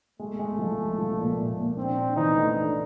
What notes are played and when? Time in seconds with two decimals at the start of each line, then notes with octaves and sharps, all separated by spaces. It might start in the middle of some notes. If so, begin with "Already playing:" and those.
0.19 G#3 A3
0.39 G#3
0.59 F3
0.79 G#3
0.98 F3
1.18 A#2
1.38 A#2
1.58 A#2
1.77 C4 D4
1.97 D4
2.16 E3 D#4
2.35 A3
2.55 D4